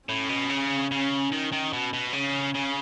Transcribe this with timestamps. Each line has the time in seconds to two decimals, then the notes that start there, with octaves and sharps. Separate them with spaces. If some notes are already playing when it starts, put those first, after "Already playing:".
0.08 A2 C#4
0.29 B2
0.50 C#3
0.91 C#3
1.32 D#3
1.52 D#3
1.73 B2
1.93 B2
2.13 C#3 C#4
2.54 C#3